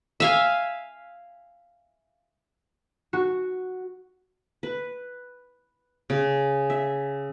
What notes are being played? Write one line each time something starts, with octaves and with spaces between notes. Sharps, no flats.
E5 F5 G#5
F#4
B4
C#3
E5